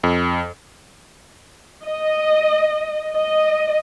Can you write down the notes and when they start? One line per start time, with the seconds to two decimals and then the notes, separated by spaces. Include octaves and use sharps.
0.04 F2
1.83 D#5
3.12 D#5